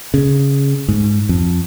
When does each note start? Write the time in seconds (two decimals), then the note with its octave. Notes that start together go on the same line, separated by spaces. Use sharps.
0.14 C#3
0.89 G#2
1.29 F2